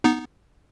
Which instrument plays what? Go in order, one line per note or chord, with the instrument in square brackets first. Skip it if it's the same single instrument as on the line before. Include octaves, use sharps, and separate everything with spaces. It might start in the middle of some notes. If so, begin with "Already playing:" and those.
[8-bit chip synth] B3 D#4